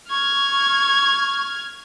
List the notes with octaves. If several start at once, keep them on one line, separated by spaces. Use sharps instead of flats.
C#6 F6 G#6